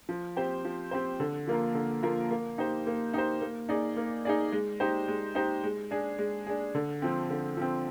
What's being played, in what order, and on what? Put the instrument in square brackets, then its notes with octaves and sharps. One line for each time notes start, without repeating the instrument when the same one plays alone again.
[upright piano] F3
C4 G4 C5
F3
C4 G4 C5
D3
F3 A#3 F4 A#4
D3
F3 A#3 F4 A#4
A#3
D#4 G4 C5
A#3
D#4 G4 C5
A#3
D#4 G#4 D5
A#3
D#4 G#4 D5
G#3
D#4 G4 C5
G#3
D#4 G4 C5
G#3
D4 G#4
G#3
D4 G#4
D3
F3 C4
D3
F3 C4